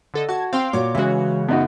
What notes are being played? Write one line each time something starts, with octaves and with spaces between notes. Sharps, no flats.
D3 A4 D#5
F#4 A5 G#6
C4 F5 G5 C6
A#2 F4 F#4 C#5 D6
C#3 E3 G#3 C#4 F#4
F#2 B3 D#4 F#4